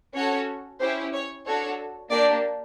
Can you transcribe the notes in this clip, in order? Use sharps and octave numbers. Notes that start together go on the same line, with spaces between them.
C#4 F#4 A4 C#5
C#4 E4 G4 C5
C#5
D4 F#4 A4 C#5
A#3 D4 G4 D5